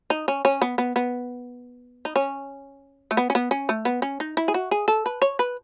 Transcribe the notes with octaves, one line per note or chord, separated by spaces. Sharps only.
D#4
C#4
C#4
B3
B3
B3
D#4
C#4
A3
B3
C#4
B3
C#4
A3
B3
C#4
D#4
E4
G#4
F#4
G#4
A4
B4
C#5
B4